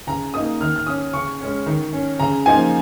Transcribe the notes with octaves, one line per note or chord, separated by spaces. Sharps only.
C#3 A#5
A#3 D#4 D#6
D#3 F6
F6
C#4 D#6
C#3 C#6
G#3 C#4
D#3
C#4
C#3 A#5
F3 A#3 D#4 G#5